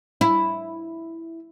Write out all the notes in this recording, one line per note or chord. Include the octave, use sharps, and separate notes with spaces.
E4